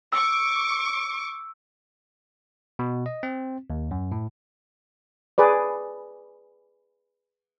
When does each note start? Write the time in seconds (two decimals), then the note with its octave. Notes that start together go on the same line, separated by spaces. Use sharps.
0.13 C#6 D6 E6
2.79 B2
3.06 D#5
3.23 C4
3.70 D#2
3.91 F#2
4.12 A2
5.38 G#4 B4 D5